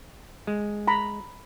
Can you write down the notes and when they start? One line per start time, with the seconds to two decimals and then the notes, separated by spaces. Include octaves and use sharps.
0.47 G#3
0.87 A#5 B5